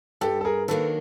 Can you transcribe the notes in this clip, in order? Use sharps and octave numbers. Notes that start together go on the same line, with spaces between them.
G2 G4 A4
A4
G#4 A#4
D#3 F#3 A#3 D4 A4 B4